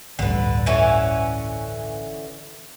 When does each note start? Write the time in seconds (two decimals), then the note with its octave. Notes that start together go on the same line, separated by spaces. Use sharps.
0.19 A1 D2 G2 D3 B4
0.66 D3 E3 C#4